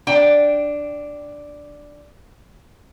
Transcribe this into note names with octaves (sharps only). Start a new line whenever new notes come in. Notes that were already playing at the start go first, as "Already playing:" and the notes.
D4 G5